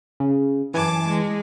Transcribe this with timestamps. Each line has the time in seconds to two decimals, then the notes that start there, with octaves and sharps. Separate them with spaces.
0.20 C#3
0.74 F#2 E3 G#5 A5 D6
1.07 G#3